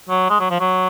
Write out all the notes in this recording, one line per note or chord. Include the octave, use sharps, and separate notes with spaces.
F#3
G#3
F#3
F3
F#3